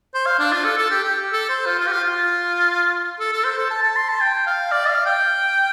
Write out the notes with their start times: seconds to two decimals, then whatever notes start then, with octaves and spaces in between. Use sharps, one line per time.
0.14 C5
0.26 F5
0.39 D4
0.52 F4
0.65 A4
0.78 A4
0.91 G4
1.03 G4
1.32 A4
1.49 C5
1.66 F4
1.79 F4
1.87 G4
1.92 F4
2.04 F4
3.19 A4
3.32 A4
3.44 C5
3.58 A4
3.71 A5
3.82 A5
3.96 C6
4.09 A5
4.21 G5
4.46 F5
4.72 D5
4.89 F5
5.06 G5